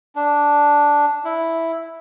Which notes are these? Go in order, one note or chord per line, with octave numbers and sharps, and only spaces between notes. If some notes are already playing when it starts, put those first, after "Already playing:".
D4
E4